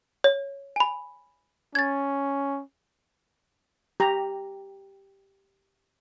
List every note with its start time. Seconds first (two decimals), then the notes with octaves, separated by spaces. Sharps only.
0.24 C#5
0.76 G#5 B5
1.75 C#4 G#6 A6
4.00 G4 A#5